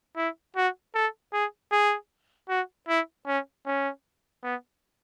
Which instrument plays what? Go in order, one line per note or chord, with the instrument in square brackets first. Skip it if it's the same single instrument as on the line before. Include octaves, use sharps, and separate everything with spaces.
[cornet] E4
F#4
A4
G#4
G#4
F#4
E4
C#4
C#4
B3